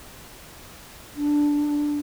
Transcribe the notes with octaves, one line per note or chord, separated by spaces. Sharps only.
D4